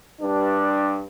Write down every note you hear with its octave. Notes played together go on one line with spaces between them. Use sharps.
G2 D4